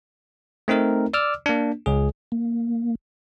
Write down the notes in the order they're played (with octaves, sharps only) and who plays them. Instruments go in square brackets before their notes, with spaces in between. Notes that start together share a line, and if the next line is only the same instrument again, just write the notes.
[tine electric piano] A3 C4 D#4 A#4
D5 D6 E6 F6
A#3 D4
C#2 G#4
[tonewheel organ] A#3